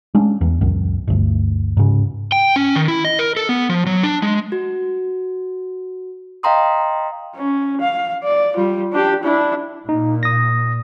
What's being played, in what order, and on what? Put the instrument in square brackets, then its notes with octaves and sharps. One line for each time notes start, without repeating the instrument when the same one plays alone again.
[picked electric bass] G#3 C#4 D4
E2
C#2 F#2
G1 D2
G#2 C#3
[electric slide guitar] G5
C#4
D#3
E4
D#5
A#4
A4
B3
F3
F#3
D4
G#3
[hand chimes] F#4
D#5 F5 G5 A#5 C6 D#6
[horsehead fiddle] C#4
F5
D5
G3 F4
D4 G4
D4 E4
[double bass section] A#2 [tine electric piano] D#4
[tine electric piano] D#6 A#6